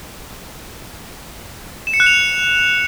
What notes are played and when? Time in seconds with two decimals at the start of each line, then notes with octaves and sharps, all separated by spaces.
1.87 E7
1.93 C#7
2.00 F#6
2.06 F7